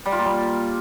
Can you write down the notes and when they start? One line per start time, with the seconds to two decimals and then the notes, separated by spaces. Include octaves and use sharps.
0.06 G3
0.12 F4
0.19 A#3
0.25 G3